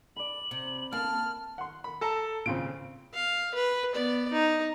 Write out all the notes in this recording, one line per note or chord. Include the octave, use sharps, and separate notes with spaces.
D5 B5 F#7
C3
A#3 A5 B5 F6
F#5 C6
B5
A4 A5 A#5
A#2 C#3 C4 D7
F5
B4
B3 D5
D#4